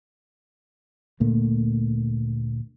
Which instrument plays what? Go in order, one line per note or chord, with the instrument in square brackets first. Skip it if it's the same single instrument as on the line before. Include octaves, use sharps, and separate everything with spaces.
[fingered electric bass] D2 A#2 A3 A#3